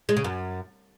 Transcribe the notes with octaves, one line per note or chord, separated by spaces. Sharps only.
G#3
C#3
F#2